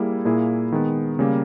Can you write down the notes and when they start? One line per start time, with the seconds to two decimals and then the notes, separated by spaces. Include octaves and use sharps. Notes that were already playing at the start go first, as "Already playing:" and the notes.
Already playing: G3 A#3 E4 G#4
0.25 A#2 A#3 E4 G#4
0.72 D#3 G#3 B3
1.19 C#3 G3 A#3